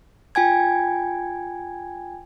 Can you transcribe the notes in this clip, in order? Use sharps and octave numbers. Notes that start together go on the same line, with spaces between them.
F4 G5 G#5 G#6